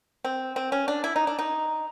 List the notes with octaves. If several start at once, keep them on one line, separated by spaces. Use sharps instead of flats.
C4
C4
C#4
D4
E4
D#4
D4
D#4